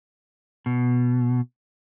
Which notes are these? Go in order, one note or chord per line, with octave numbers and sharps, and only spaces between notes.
B2